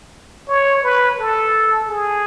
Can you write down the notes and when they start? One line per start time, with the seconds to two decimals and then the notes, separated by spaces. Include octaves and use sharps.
0.48 C#5
0.83 B4
1.19 A4
1.89 G#4